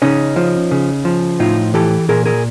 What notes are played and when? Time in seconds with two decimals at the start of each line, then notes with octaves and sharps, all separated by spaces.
0.02 C#3 C#4 D#4
0.36 F3
0.71 C#3
1.05 F3
1.40 A2 D#4 F4
1.74 E3 G4 A4
2.09 A#2 G#4 A#4
2.26 G#4 A#4